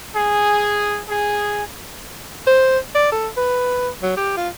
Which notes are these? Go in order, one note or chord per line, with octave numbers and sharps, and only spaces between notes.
G#4
G#4
C5
D5
A4
B4
F#3
G4
F4